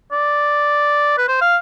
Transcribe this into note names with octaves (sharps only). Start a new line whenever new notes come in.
D5
B4
C5
F5